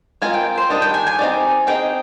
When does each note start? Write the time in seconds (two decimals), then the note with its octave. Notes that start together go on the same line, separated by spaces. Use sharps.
0.22 G#3 C4 F4 A#4 G#5
0.34 G5
0.58 C5
0.70 D#3 G3 D4 D#5
0.82 G5
0.94 G#5
1.07 G#5
1.19 C4 D#4 G4 D5
1.67 C4 D#4 G#4 D#5 G5